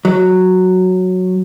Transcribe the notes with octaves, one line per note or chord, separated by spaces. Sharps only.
F#3